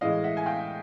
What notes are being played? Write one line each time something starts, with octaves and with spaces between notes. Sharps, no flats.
A2 E3 G#3 D#5 F5
E5 F#5
G#5
F5 G5